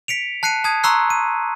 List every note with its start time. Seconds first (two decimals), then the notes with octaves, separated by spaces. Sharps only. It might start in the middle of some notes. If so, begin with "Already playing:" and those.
0.08 B6 C#7 D7 F7
0.43 A5 F#6 C7 C#7 D#7
0.64 A5 D#6 G#6
0.83 A#5 C6 C#6 E6 F#6 C7
1.10 D#7